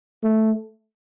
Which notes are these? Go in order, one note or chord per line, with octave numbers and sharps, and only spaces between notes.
A3